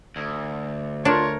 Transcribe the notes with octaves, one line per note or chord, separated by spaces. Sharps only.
D2
D4 F4 A#4 C#5